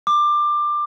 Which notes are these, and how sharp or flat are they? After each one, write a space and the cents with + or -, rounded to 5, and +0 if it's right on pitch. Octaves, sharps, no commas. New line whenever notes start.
D6 +20